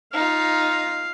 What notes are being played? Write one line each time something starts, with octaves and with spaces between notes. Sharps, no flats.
D#4 F4 F5